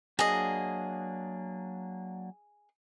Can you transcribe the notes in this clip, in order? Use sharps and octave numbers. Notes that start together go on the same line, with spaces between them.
F#3 A#3 D4 G#4 D#5